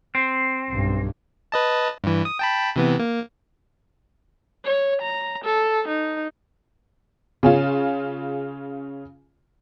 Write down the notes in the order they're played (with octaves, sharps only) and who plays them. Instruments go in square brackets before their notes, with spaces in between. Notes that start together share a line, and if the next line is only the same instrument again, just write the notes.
[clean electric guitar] C4
[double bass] B1 G2
[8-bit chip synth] B4 D#5 A5
G2 E3
D#6
G5 A5 B5
C3 E3 B3
A#3
[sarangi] C#5
A#5
A4
D#4
[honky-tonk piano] C#3 C#4 F4